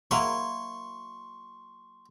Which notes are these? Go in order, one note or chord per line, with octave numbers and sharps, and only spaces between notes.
F#3 A#3 E4 C6 C#6